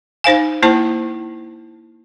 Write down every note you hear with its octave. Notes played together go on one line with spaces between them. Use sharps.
D#4 C5 F5 G#5
A#3 E4 C5 A5